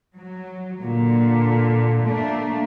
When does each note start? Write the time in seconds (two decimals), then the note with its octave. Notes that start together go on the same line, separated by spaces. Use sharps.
0.16 F#3
0.82 A#2 D3
2.04 A3 A#3 D4